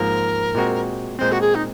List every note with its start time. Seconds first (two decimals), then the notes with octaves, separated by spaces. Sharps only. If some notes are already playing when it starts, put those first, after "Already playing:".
Already playing: G#2 F3 A#3 A#4
0.55 A#2 G#3 C4 F#4
1.19 A#2 G#3 C4 C5
1.32 F#4
1.41 G#4
1.55 D#4